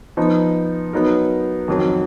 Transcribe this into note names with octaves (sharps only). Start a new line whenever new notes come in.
F3 B3 D#4
F#3 B3 D#4 A#4
F2 D#3 F#3